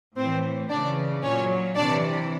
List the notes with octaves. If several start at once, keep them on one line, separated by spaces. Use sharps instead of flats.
A2 E3 C4 C5
C#3 E3 D4 D5
A#2 F#3 C#4 C#5
C3 E3 D4 D5